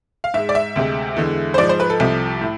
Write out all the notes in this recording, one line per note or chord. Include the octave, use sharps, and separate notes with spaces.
F5
G#2 G#3 E5
D5
E5
D2 C3 G#3
E2 D3 G#3
C5
G#2 F3 G#3 D5
C5
B4
A4
C2 C3 F3
A2